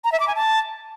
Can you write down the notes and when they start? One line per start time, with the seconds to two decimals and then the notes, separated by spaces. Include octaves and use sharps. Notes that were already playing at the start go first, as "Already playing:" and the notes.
0.04 A#5
0.12 E5
0.20 D6
0.28 G#5
0.35 A5